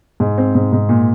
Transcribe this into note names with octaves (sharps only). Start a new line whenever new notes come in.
G#2
C4
G#2
G#2
A#2